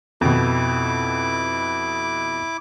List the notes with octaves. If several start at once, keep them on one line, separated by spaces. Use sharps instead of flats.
F2 B2 E4 D6